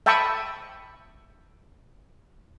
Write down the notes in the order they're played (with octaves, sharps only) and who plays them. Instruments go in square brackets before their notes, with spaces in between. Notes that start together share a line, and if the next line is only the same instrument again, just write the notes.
[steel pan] E5 G5 A5 B5 C#6 D#6